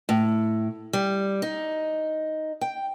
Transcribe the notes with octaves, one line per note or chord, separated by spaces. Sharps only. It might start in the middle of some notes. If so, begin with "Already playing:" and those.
A2
G3
D#4
G5